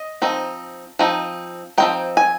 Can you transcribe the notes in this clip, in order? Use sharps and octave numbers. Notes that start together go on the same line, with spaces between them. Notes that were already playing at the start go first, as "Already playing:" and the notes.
Already playing: D#5
F3 C4 D#4
F3 C4 D#4
F3 C4 D#4 G5
G#5